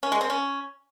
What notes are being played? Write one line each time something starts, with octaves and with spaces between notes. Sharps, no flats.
C#4
G#3
C4
C#4